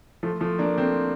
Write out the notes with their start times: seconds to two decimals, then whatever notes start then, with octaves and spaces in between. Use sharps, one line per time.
0.23 F3 A3
0.40 F3 A3
0.59 A#3 D4
0.78 A3 C4